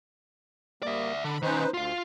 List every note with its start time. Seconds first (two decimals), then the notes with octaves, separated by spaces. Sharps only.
0.83 G3 A#3 D5 E5
1.24 D3 B5
1.42 D#3 C#4 D#4 B4 C5
1.74 D2 F4 F5